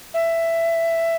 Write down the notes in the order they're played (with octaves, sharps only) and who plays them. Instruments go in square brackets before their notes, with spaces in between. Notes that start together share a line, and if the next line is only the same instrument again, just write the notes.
[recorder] E5